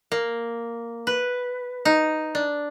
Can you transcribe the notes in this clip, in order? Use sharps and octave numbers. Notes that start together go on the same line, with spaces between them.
A#3
B4
D#4
D4